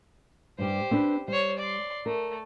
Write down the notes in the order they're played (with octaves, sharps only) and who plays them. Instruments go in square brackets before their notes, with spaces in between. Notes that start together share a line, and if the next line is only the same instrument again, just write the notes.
[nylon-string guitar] G2 G3 [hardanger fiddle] G4 C5
[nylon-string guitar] C4 D4 B4
[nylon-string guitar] G3 [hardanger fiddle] C5 C#5
[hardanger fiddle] D5 C6
[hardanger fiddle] A3 [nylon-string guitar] A#4